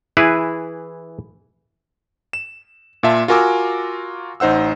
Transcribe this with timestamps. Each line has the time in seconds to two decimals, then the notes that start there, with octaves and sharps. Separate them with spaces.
0.17 E3 E4 G#4 B4
2.33 E7
3.03 A#2 F4 E5 A5
3.28 F4 F#4 A#4 G#5 D6 E6
4.40 A1 D#4 C5 F#5 E6